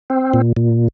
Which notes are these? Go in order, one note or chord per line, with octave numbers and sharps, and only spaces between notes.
C4
A#2
A#2